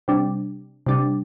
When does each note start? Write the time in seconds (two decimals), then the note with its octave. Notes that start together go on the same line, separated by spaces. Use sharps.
0.08 C3 G3 D4
0.87 C3 G3 D4